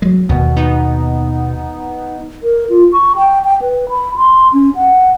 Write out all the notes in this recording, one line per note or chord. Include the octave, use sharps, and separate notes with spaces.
F#3 G#3
D#2 B2
B3 D#4
A#4
F4
C#6
G5
G5
B4
B5
C6
C#4
F#5